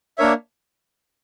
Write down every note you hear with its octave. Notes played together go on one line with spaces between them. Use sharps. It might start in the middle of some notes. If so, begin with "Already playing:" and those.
A#3 D4 A#4 C#5 E5